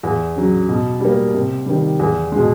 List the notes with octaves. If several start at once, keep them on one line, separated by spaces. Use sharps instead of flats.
E2
C#3 F#3
B2
G3 A#3
C3
D#3 G3
E2
B2 G#3